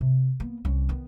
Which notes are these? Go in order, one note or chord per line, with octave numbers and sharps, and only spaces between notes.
C3
A#3 B3
C2 C#4
D#3 B3